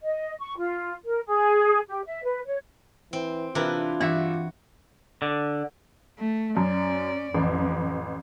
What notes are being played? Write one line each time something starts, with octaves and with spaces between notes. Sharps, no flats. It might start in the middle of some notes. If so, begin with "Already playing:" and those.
D#5
C#6
F4
A#4
G#4
G4
E5
B4
C#5
E3 C4
C3 E3 D4 E4 F4 A#4 B4
G2 E3 F#4 E5
D3
A3
F#2 C#4 D5
A1 F2